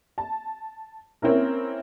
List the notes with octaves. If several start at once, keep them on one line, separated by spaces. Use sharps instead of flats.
A5
A#3 C4 C#4 E4 A#4